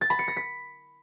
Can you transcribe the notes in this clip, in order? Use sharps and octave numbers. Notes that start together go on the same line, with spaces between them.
A6
B5
C#7
A#6
B6